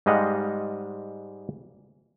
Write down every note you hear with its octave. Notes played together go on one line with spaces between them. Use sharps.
G#2 G3 G#3 D#5 F5 F#5